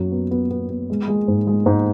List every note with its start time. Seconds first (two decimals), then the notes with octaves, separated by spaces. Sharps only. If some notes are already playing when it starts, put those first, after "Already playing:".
Already playing: F#2 F#3
0.12 B3
0.31 B3
0.50 B3
0.70 B3
0.90 G#3
1.08 G#3
1.28 G#2
1.47 G#3
1.66 G#2